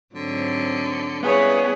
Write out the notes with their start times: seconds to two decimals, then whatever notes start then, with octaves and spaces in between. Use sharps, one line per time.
0.15 G#2 D3 F#3 C4
1.23 C#3 G3 B3 E4 G#4 B4 C#5